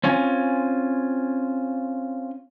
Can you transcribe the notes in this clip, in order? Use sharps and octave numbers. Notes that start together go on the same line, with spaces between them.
C4 C#4 F4 G#5